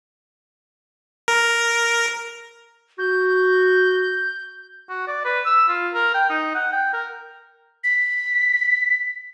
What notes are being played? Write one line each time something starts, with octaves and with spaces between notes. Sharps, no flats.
A#4
F#4 G6
F#4
D5
B4
E6
F4
A#4
G5
D#4
F#5
G5
A#4
B6